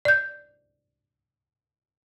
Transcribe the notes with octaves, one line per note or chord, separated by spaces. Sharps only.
D5 G6